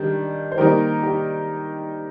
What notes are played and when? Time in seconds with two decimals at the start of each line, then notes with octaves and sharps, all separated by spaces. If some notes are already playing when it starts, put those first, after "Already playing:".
Already playing: D#3 G3 D4
0.52 C5
0.58 D#3 G3 A#3 D#4 G4 A#4
1.03 G4